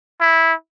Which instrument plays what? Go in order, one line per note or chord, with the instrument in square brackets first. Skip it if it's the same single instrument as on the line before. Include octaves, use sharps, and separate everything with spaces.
[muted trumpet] E4